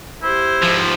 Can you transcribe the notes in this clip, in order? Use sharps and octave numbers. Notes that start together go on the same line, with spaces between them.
E4 G4 C5
G#2 F3